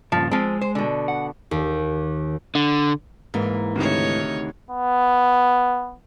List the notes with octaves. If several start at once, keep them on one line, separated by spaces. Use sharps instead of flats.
G2 A#2 C#3 F3
F3 G#3 C4
C5
B2 D3
F#5
D#2
D3
G#2 E3 A#3
D2 C3 D#3 A3 D#4 C#5
B3